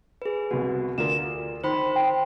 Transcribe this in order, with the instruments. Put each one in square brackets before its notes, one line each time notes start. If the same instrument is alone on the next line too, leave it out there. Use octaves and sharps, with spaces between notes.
[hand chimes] G#4 B4
[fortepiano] C2 B3 [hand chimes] F#4
[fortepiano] D2 F4 A#4 [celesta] E7
[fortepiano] D#3 [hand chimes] C5 B5 C6
[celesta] G5